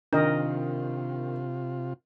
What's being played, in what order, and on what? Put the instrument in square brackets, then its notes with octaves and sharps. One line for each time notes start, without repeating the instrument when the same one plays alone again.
[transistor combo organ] C3 F4 [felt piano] D#3 [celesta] D4 [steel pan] A#4 D#5